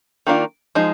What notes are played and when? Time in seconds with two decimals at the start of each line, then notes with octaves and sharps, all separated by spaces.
0.27 D#3 A#3 D4 F4
0.75 F3 G#3 D#4